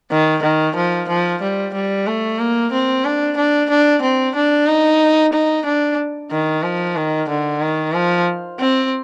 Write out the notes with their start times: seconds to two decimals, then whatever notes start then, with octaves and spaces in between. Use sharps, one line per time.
0.11 D#3
0.43 D#3
0.76 F3
1.09 F3
1.42 G3
1.74 G3
2.07 A3
2.39 A#3
2.72 C4
3.05 D4
3.37 D4
3.70 D4
4.02 C4
4.35 D4
4.67 D#4
5.33 D#4
5.66 D4
6.31 D#3
6.63 F3
6.96 D#3
7.29 D3
7.61 D#3
7.94 F3
8.59 C4